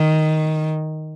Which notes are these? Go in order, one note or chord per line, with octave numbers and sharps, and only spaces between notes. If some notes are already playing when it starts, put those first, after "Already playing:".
Already playing: D#3